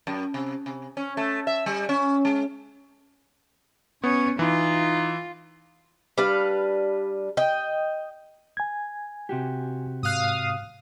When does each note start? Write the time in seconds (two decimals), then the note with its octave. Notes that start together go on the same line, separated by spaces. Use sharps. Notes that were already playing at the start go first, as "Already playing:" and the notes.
0.07 F#2
0.34 C3
0.66 C3
0.97 C#4
1.17 A3
1.47 E5
1.66 G3
1.89 C#4
2.25 G#3
4.04 B3 C#4 C#5
4.39 E3 D#4 F4
6.18 G3 D4 B4 F5
7.37 D#5 G5
8.57 G#5 G#6
9.29 C3 F#4 G4
10.03 G#2 F5 D#6 F#6